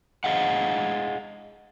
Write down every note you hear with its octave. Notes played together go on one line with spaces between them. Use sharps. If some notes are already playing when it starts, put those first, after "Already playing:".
G#4 D#5 F5 F#5